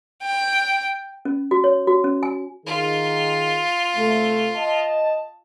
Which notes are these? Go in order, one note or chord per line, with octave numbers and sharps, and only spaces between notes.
G5
C#4
F#4
C#5
F#4
C#4
G#5
D#3 F4 G#4
C3 A3
D#5 A5